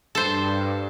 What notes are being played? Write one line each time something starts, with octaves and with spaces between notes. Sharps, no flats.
G2 A4 C5